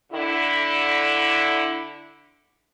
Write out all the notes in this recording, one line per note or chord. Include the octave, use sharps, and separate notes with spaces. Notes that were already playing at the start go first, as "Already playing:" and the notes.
D3 E4